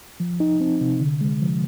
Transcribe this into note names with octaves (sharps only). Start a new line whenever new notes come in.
F3
D#4
C4
C3
D3
G#3
F3